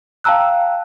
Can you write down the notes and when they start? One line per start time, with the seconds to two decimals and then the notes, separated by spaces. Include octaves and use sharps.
0.24 F5 G5 A5 A#5 E6 F#6